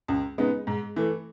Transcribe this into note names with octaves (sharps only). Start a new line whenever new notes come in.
C#2
C#3 G#3 B3 D#4
G#2
E3 A3